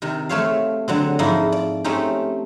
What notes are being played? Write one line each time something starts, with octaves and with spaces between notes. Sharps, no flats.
C3 D#3
A3 C4 G4 C#5 E5 F5
D3 F#3 C4
G#2 F3 D#4 E4
D5
A3 C4 C#4 D#4 G4